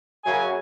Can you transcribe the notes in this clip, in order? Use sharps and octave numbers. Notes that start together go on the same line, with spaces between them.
F#2 C#3 F#3 G#5